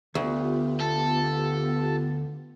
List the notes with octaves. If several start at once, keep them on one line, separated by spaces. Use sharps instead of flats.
D2 D3 B3 F4 G4
A4